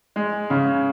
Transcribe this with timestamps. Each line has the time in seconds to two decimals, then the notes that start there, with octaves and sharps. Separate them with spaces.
0.16 G#3
0.50 C#3